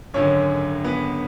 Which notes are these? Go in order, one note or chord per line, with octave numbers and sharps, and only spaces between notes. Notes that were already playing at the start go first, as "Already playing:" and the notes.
G#1 F#2 D3 G#3 C#4 C#5
B3 B4